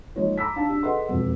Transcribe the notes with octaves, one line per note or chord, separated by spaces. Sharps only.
F3 G#3 A#3 D#4 C#5
A#5 B5 D6 E6 B6
D4 F5 A5
D4 G4
G#4 A4 B4 D#5 F#5 C6
E1 F2